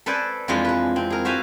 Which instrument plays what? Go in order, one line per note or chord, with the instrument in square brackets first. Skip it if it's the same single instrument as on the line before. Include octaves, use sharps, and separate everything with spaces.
[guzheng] A4 B4 C5 D5 E5 G#5
F2 E3 F3 G#3 D4 C6
G#3 B4
C4
G#4 A#4
F#4 C5 E5 F5 G#5